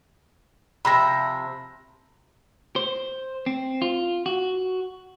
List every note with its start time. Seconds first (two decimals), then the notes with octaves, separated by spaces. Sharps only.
0.85 C3 F3 E5 B5 A#6
2.76 C5
3.46 C4
3.82 F4
4.26 F#4